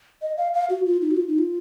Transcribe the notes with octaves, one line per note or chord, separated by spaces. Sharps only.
D#5
F5
F5
F#4
F4
D#4
F#4
F4
D#4
F4